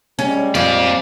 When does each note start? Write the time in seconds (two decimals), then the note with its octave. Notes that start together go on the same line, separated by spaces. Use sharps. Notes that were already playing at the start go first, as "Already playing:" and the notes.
0.19 G3 G#3 C#4
0.55 F2 A#2 D5